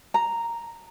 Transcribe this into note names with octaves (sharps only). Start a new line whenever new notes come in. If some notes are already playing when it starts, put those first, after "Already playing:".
A#5